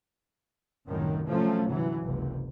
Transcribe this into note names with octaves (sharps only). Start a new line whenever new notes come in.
C2 F#2 A2 D#3 F#3
C3 F3 F#3 A3 C#4
G1 C3 E3 F#3
F#1 C#2 C3